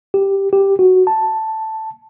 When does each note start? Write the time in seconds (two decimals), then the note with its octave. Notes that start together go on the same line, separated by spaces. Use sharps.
0.14 G4
0.53 G4
0.79 F#4
1.07 A5